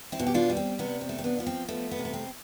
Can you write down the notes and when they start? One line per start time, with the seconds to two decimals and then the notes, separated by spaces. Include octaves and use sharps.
0.12 C4 E4
0.19 B2
0.27 G4
0.34 D4 F4
0.50 G3
0.57 C4
0.79 C3 B3
1.01 C4
1.09 A3
1.18 C4
1.24 B3 D4
1.38 F3 B3
1.47 C4
1.69 A3 B3
1.91 B3
1.99 C3
2.05 B3
2.13 C4